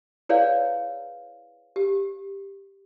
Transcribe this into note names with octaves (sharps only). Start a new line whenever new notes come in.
E4 G#4 B4 C#5 D5 F5
G4